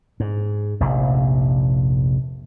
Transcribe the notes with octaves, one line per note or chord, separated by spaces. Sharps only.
G#2
F1 A#1